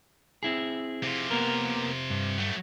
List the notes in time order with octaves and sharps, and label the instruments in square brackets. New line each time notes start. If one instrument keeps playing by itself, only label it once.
[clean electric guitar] C4 E4 G#4
[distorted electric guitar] C3 F4
[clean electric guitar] A#3 B3 A#4
G2
[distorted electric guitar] F#3 A3